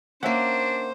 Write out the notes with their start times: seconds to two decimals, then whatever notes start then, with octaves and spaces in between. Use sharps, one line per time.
0.23 A#3 C#4 D4 A#4 C5 E5 F#5